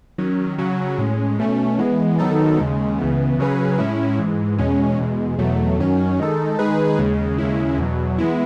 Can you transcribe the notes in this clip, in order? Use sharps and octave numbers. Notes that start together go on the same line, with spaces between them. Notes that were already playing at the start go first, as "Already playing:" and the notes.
D#3 F#3 C#4
C#3 F#3 C#4 F#4
A2 G#3 C#4
B2 A3 C#4
E3 G#3 B3
D#3 F#3 B3 D#4 A4
D#2 C#3 G#3
C#2 C#3 E3 B3
C#3 F#3 C#4 G#4 B4
A2 G#3 C#4 E4
G#2 E3 G#3
E2 B2 G#3 C#4
E2 B2 G#3
E2 B2 F#3 A3
F#2 D#3 F#3 C#4
D#3 G#3 D#4 A4
D#3 G#3 D#4 G#4 B4
D#2 C#3 G#3
D#2 C#3 G#3 C#4 E4
E2 B2 F#3
E3 G#3 B3 E4